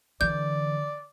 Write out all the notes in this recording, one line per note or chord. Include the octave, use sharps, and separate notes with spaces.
D3 E3 D5 G6